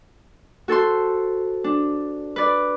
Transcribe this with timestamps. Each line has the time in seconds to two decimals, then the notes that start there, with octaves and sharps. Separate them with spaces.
0.68 F#4 A4 C5 C6
1.64 D4
2.36 B4 D5